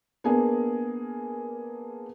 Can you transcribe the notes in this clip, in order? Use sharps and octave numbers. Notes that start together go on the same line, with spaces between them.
A#3 B3 D4 G#4 A#4